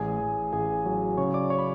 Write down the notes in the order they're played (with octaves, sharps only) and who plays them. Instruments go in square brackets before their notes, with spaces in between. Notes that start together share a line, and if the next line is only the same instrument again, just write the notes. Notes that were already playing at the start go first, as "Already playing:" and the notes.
Already playing: [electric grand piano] A1 G#4 G#5
A1
A1 G#4 G#5
F#3
C#3 C#5 C#6
D5 D6
C#5 C#6
B5